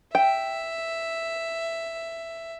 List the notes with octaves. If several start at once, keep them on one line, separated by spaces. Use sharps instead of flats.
E5 G5